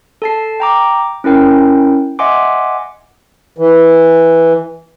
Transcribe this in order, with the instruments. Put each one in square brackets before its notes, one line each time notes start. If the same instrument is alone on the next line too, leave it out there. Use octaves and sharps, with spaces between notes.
[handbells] A4 A5 C7
G5 A#5 D6
C#4 E4 A#4 G5
D#5 E5 F#5 G#5 C6 D6
[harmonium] E3